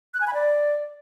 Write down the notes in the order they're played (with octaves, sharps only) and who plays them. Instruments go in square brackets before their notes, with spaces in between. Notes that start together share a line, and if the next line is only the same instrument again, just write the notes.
[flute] F#6
G#5
B5
D5